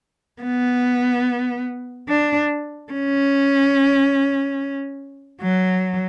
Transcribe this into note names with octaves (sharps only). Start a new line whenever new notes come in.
B3
D4
C#4
F#3